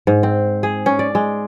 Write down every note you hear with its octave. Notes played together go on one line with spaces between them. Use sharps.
G#2
C4
G#4
C#4
D5
G#3